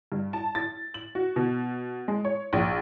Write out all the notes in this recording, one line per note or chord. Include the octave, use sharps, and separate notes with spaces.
G2
A5
A6
F#7
F#4
B2
G#3
C#5
A#1